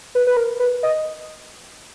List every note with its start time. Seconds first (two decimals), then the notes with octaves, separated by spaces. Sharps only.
0.15 B4
0.27 B4
0.37 A#4
0.60 B4
0.83 D#5